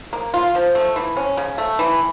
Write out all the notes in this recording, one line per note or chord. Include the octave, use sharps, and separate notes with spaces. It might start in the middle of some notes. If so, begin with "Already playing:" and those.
A#3
F4
F3
A3
E3
C#4
C#3
A3
E3